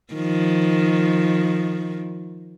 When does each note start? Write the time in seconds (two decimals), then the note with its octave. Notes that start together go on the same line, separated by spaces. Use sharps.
0.14 D#3 F3